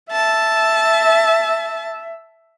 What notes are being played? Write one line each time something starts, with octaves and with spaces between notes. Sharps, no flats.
E5 A5